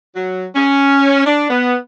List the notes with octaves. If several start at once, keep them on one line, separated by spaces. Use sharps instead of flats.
F#3
C#4
D4
B3